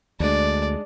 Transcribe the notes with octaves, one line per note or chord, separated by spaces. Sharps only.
D2 G#3 D4 D5